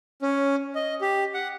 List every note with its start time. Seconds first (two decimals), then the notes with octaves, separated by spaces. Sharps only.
0.22 C#4
0.75 D#5
1.01 G4
1.34 F#5